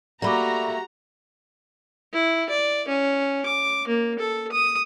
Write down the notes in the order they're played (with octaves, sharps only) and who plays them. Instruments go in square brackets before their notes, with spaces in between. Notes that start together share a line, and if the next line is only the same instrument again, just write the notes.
[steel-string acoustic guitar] A3 A#3 [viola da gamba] F#4 G4 [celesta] D5 B5 D6 [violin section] A#5
[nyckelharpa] E4
D5
C#4
D6
A#3
A4
D#6